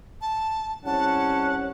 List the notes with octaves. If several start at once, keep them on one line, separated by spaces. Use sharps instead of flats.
A5
C2 C#4 F#5 A5